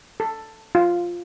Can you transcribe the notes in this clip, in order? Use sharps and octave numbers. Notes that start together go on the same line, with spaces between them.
A4
F4